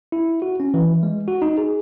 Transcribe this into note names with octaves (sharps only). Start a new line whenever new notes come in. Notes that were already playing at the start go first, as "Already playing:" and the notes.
E4
F#4
C#4
E3
G#3
F#4
D#4
G#4